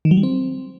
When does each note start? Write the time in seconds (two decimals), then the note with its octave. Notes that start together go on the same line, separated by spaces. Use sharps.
0.05 D#3
0.11 F#3
0.17 G3
0.23 C4